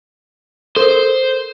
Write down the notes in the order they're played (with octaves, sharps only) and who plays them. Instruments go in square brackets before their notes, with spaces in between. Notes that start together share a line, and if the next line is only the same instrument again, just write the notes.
[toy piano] A4 A#4 [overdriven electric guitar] C5